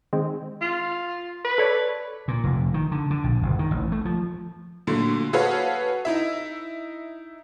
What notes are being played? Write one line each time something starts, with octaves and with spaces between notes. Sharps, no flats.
D#3 G#3 C4
F4
B4
A4 C#5 D5
A#2
F1
D#3
D3
D3
A#1
F#1
D#3
A1
A3
F3
A#2 D3 F#3 A3
F#4 G#4 A4 B4 C#5 F5
D#4 E4 E5